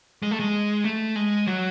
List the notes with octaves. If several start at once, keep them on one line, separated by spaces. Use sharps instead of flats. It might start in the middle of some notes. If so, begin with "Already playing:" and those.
G#3
A3
G#3
A3
G#3
F#3